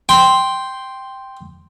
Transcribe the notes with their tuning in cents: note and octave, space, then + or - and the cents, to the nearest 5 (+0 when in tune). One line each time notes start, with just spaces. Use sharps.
G5 +0 C6 +0